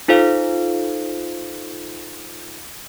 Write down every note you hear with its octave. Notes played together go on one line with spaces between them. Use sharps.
D#4 F4 A4 C5 F5